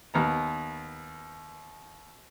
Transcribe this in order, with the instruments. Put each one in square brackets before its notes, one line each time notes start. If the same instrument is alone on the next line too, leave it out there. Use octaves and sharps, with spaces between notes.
[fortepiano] D#2 B3 A#5